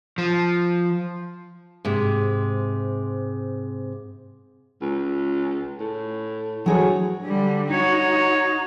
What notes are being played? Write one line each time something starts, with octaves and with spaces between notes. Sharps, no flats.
F3
G#2 C3
C#2
A2
D2 F#3 G#4 C#5
D3 G3
D#4 F#4 C#5